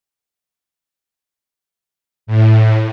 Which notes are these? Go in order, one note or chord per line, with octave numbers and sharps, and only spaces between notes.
A2